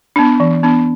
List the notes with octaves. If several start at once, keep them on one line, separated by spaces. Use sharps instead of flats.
B3 D4
E3
B3 D4